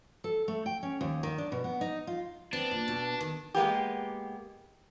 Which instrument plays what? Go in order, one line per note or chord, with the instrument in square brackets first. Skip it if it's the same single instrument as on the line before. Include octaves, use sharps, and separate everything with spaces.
[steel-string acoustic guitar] A4
A3
G5
C#4
D#2
D#3
D4
B2
B3
D#4
F4
[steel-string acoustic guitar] B3 C4 [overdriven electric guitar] D4
[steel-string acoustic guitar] A#2
B2
D#3
[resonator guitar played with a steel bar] G#3 A#3 B3 G4